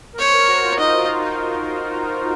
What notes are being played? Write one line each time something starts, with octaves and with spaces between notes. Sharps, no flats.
A#4
C5 C#5
A#4
F#4
F4
D#4 D#5
F4
D#4